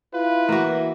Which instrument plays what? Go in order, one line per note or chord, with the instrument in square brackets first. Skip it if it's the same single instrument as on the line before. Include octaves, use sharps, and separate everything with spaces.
[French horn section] E4 [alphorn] F4 [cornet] B4
[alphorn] E3 [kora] A#3 F#4